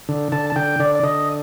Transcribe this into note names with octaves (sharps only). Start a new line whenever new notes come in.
D3
D3 A5
A5
D3 G5
D3 D5
D5
D3 D#5